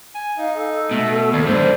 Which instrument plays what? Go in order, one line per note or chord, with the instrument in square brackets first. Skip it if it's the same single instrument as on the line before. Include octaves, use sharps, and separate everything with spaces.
[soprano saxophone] G#5
[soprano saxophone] D#4 [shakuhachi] F5
[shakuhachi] A4
[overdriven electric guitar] B2 [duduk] A3
[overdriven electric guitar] D#2 [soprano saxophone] D5
[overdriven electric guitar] G#2 D4 [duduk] C5